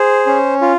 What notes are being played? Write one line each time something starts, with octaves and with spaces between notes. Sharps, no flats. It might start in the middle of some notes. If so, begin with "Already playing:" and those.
Already playing: G#4 C5
C#4
F4